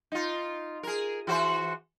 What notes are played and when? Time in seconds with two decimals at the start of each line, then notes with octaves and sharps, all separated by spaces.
0.12 D#4 F4
0.83 G#4 A#4
1.27 E3 F#4 C5